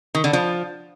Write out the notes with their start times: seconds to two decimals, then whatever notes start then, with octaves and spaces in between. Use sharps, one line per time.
0.15 D#3
0.24 D3
0.33 F3